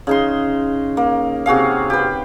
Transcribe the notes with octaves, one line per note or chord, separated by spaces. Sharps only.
C#3 D#4 C6
A#3
C3 F#4 G#4 F5
G4 B4